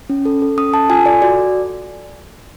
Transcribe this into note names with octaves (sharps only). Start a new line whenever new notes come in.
C#4
A4
A4
C#4 D#6
A4 A5
F4 G#5
A4 D5
F#4 D5